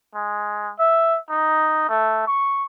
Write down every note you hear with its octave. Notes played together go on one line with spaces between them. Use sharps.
G#3
E5
D#4
A3
C#6